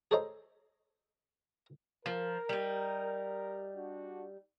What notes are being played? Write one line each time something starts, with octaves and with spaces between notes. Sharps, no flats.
G#4 A4 C5 C#5 D#5 A#5
F3 A#4
G3 D#4
D4 F#4